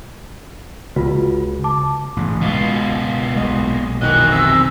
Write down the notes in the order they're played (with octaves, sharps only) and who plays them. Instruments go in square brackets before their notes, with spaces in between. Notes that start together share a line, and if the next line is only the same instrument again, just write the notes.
[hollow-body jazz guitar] C#2 [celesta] F4 F#4
[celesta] A5 D6
[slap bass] A1 G#2 C#3
[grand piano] C#2 [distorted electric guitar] B2 F4 [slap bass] G#3
[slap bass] B1 G#3 [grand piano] A#2 D#5
[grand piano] F1 D#3 E3 [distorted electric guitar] F#4 D#5 [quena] F#6
[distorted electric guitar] C3 [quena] E6